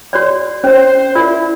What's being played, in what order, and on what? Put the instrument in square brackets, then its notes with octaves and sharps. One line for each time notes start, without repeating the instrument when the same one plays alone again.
[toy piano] F#4 C#5 D5
[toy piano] C#4 C#5 [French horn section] C5
[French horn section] E4 [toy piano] F4 A#4 D5